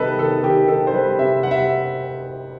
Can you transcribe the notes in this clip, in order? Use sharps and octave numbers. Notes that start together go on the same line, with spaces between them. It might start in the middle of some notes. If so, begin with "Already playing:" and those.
Already playing: C3 D#3 G3 A4 B4 D#5
D#3 A4
D#3 G4
D#3 A4
C5
G3 B4
C3 E5
G3 F#5
E5